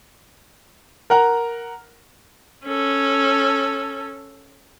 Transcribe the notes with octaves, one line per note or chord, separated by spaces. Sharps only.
A#4 F#5 A#5
C#4 A4